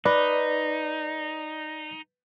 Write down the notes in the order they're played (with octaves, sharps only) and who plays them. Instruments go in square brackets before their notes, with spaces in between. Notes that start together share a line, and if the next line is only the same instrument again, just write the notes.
[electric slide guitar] D#4 [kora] B4 [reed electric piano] D5